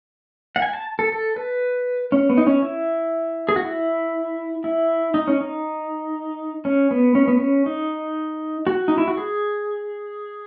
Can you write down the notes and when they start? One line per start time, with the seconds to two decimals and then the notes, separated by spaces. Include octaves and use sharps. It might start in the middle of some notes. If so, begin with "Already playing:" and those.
0.56 F#5
0.62 G#5
0.73 A5
0.99 A4
1.12 A4
1.36 B4
2.12 C#4
2.29 B3
2.38 D#4
2.47 C#4
2.63 E4
3.49 G#4
3.56 F#4
3.64 E4
4.64 E4
5.14 D#4
5.28 C#4
5.41 D#4
6.65 C#4
6.91 B3
7.15 C#4
7.28 B3
7.39 C#4
7.66 D#4
8.67 F#4
8.88 D#4
8.98 E4
9.08 F#4
9.17 G#4